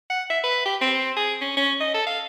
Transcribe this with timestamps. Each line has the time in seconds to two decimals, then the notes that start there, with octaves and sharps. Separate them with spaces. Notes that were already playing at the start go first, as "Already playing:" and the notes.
0.10 F#5
0.30 E5
0.43 B4
0.65 G4
0.81 C4
1.16 G#4
1.41 C#4
1.57 C#4
1.81 D#5
1.94 A4
2.07 F5